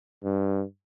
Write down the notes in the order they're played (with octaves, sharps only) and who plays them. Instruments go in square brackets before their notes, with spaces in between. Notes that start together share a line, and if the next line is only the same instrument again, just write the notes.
[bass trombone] G2